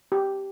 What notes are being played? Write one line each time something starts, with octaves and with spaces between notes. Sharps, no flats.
G4